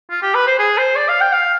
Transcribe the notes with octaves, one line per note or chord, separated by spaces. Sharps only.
F4
G4
B4
C5
G#4
C5
D5
F5
G5
F5